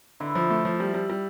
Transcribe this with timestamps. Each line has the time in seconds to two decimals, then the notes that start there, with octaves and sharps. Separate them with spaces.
0.20 D3 E4
0.35 F3
0.50 A3
0.65 F3
0.80 G3
0.94 G3
1.10 G3